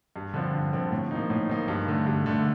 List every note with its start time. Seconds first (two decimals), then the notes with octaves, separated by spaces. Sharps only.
0.16 G2
0.34 D3 F3 C4
0.53 G2
0.73 D3 F3 C4
0.92 A2
1.11 F3 A#3 D#4
1.30 A2
1.49 F3 A#3 D#4
1.68 G2
1.88 D3 A3
2.07 G2
2.26 D3 A3